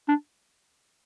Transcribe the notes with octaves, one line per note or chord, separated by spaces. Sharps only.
D4